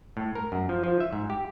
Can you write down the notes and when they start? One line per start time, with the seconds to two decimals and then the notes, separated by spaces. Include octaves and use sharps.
0.17 A2
0.35 A#4
0.52 F#2
0.69 F3
0.84 F3
1.00 E5
1.13 G#2
1.30 G4